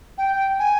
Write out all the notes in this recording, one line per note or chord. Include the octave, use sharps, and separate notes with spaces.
G5
G#5